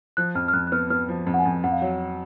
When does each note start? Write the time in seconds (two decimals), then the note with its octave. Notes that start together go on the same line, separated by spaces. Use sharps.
0.17 F3 F#6
0.35 F2 F6
0.48 F6
0.53 F2 F#6
0.67 F#6
0.72 B3 F6
0.90 B3 F6
1.09 F3
1.26 F2
1.34 F#5
1.39 G#5
1.45 F2
1.64 F2 F#5
1.72 F5
1.81 F#3 F#5